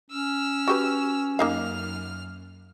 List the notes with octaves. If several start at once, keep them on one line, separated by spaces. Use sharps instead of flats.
C#4 E6 F6
F#4 G4 B4
F#2 A#3 D#4 F5 F6